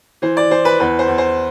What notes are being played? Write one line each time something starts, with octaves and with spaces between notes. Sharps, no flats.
E3 C5
D5
E3 C5
B4
E2 B4
C5
E2
C5